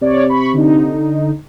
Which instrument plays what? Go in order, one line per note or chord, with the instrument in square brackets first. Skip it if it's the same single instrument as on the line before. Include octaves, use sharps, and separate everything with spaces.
[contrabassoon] C3 [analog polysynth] C#5 D5
[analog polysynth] B5 C#6
D3 D#4